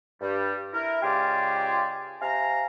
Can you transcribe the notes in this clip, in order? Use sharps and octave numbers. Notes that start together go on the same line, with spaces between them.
G2 G3
E4 A#4
C#2 F4 G4 C5 D5 G#5
C3 F5 G#5 A#5